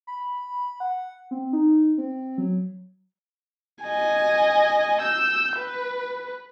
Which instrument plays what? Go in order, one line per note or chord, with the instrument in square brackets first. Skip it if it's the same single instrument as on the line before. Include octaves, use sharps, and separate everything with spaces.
[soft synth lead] B5
F#5
C4
D#4
C4
F#3
[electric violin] D#5 G#5
E6 G6
B4